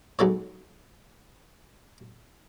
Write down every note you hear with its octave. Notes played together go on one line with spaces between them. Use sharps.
B1 G#3 A4 C#5